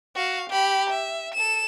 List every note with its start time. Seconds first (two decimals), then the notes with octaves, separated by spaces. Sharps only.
0.15 F#4 F5
0.50 G4 B5
0.90 E5
1.35 A4 E7